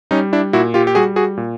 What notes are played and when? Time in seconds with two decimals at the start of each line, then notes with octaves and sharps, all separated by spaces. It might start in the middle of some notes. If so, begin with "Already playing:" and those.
0.11 G3 C#4 D#4
0.33 D4 E4
0.53 A#2 E4 F#4
0.74 F4 G4
0.87 G4
0.95 G3 F#4 G#4
1.16 F#4 G#4
1.37 A#2